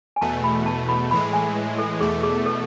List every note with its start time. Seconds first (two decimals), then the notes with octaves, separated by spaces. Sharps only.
0.16 G#5
0.21 E2 B2 A3 A5
0.44 B5
0.66 A5
0.89 B5
1.10 A2 E3 G#3 B5
1.33 G#5
1.78 A4
2.00 E2 B2 A3 G#4
2.23 G#4
2.46 A4